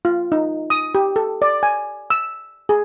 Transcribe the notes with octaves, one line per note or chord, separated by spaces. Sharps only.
F4
D#4
D#6
G4
A4
D5
G#5
E6
G#4